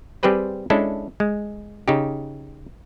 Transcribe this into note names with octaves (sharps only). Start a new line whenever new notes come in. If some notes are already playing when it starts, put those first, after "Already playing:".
G3 C4 G4 G#4 B4 C5
G#3 C#4 D4 E4 A4
G#3
C#3 D#4 G4